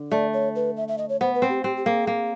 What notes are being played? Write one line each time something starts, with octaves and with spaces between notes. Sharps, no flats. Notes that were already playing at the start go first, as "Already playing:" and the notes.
Already playing: D3
A3 D5
C#5
B4
E5
E5
D#5
C#5
B3 C5
B4
C4
G4
C4 G4
G4
A#3 G#4
A#3